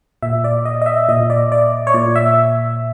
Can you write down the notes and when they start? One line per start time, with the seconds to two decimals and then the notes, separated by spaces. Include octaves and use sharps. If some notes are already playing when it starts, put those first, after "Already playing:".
0.22 A#2 E5
0.44 D5
0.65 D#5
0.82 D#5
0.86 E5
1.09 A#2 D#5
1.30 D5
1.52 D5
1.87 C#5
1.94 A#2 D5
2.16 E5